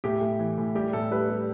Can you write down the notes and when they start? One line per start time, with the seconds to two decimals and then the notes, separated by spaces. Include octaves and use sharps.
0.04 A2 G4
0.21 A2
0.39 E3
0.58 A2
0.75 G3 G4
0.93 A2 A4
1.11 G3 B4
1.29 G3